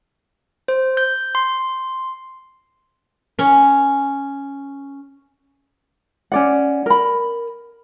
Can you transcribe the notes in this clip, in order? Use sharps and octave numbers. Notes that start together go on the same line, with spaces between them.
C5
G6
C6
C#4 C#5
C#4 D5 F#5
A#4 B5